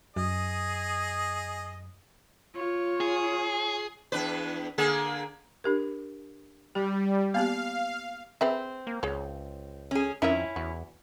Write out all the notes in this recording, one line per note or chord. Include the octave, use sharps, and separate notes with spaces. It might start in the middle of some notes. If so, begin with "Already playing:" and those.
F#2 G#4 D#5
F4 C#5
G#4
E2 D4 B4
D3 A#3 G#4
D4 G4 A#4
G3 G4
A#3 B3 G4 F5
C4 G#4 B4 E5
A#3
C#2 G#4 C#5
C#4 G#4
F2 D#3 C#4 E4 A#4 E5
E2 F#4